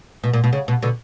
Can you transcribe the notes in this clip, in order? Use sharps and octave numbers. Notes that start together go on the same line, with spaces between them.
B2
A#2
B2
C#3
B2
B2 D3